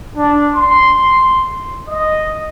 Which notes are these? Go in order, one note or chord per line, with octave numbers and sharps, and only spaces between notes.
D4
C6
D#5